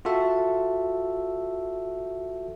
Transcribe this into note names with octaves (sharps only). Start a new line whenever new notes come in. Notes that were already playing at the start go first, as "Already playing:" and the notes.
F4 F#4 A4 E5